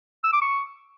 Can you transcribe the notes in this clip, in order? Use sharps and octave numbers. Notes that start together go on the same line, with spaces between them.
E6
D6
C#6